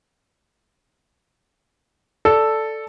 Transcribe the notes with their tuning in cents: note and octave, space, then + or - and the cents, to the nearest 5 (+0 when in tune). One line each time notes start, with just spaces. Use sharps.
A4 +0 D5 +0